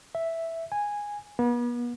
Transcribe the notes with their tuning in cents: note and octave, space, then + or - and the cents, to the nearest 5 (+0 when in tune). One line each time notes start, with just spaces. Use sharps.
E5 +0
G#5 -10
B3 -40